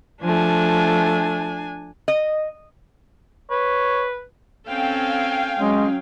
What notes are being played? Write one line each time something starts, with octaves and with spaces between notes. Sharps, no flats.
F3 A3 D4 G#5
D#5
B4 C#5
C4 C#4 A4 F5 G5 G#5
F#3 G#3 C#4